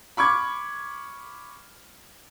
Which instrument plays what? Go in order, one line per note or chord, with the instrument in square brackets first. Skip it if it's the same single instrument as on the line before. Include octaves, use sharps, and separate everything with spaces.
[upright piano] B5 C#6 D6 G#6